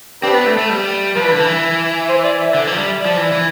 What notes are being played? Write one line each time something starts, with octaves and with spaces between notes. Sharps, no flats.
C4 D4 G4 B4
B3
A3
A3
G3
F3 B4
E3
D3
E3
C5
D5
E5
D3
E3
F3
G3
F3 D5
E3
E3